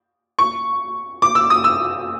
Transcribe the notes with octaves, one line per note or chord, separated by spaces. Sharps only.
C#6
D6
E6
D#6
E6